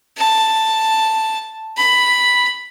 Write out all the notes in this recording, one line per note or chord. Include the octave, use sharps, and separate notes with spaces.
A5
B5